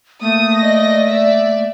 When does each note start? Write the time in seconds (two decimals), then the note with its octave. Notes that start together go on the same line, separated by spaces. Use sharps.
0.21 A3 A#3 D#6
0.59 D5 D#5 A#6
1.08 D5 E5